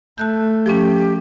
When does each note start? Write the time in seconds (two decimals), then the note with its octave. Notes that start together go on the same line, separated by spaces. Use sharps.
0.18 A3 A5 F#6 G6
0.66 F3 C#4 G4